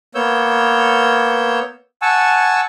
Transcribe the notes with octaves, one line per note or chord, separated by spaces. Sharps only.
A#3 B3 C#5 E6 G6
F#5 G#5 A5 C#6 E6